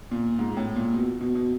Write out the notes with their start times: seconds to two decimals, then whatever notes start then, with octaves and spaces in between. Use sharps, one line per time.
0.11 A#2
0.39 G#2
0.57 A2
0.76 A#2
0.94 B2
1.21 B2
1.35 B2